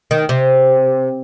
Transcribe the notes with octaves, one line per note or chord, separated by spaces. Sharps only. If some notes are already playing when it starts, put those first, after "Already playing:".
D#3
C3